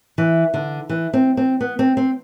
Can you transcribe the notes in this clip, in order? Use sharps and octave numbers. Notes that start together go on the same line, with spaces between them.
E3
D3
E3
C4
C4
B3
C4
C4